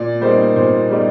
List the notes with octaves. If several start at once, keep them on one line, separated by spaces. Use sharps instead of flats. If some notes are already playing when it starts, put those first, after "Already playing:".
Already playing: A#2 D5
G3 A#3 D#4 C5
A#2 C5
G3 A#3 D#4